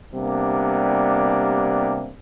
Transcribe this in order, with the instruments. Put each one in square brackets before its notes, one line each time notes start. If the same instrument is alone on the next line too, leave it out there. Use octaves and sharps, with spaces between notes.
[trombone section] C3 G3 A#3 B3 D4